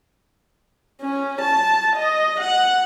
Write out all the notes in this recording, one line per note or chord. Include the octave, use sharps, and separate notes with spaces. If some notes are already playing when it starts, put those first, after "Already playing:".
C#4
A5
D#5
F#5